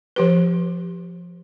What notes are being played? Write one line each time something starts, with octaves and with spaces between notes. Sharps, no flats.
F3 G4 B4